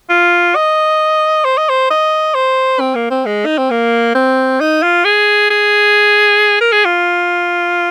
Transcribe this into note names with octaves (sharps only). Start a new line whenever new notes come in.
F4
D#5
C5
D#5
C5
D#5
C5
C4
A#3
C4
G#3
D#4
C4
A#3
C4
D#4
F4
G#4
G#4
A#4
G#4
F4